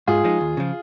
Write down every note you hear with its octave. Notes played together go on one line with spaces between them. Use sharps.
G#2 F4 G#4
F3 G#3 D#4
D#2
C#3 F3